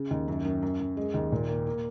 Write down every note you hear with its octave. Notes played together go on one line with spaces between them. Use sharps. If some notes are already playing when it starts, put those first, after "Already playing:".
Already playing: C#3
D#2
F#2
F#2
F#2
F#2
G#3
D#2
A#2
A#3
A#3